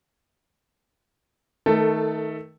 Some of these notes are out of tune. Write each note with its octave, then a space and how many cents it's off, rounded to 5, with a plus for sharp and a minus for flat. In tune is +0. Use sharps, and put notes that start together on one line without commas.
D#3 +20 A3 +0 A4 +20